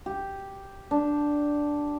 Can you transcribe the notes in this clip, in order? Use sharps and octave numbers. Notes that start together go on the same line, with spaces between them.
G4
D4